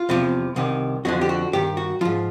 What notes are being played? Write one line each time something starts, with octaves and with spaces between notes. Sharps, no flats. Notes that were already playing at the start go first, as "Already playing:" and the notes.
Already playing: F4
E2 C3 F3
C2 C3 D#3
F2 D3 F3 F#4
G4
F#4
G2 D#3 G4
F#4
G#2 F3 F4